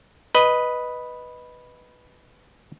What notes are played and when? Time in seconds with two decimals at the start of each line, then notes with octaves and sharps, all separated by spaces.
0.35 B4 D#5